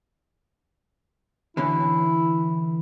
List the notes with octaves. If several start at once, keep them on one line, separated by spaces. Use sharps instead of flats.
D3 E3 C#4 E4